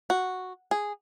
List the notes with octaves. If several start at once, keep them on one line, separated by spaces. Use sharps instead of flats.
F#4
G#4